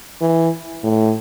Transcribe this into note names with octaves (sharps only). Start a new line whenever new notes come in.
E3
A2